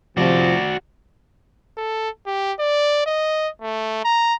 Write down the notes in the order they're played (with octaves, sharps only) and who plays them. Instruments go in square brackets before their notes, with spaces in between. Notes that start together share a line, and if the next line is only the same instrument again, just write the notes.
[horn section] C3 F3 [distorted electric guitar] F#4 D5
[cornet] A4
G4
D5
D#5
A3
A#5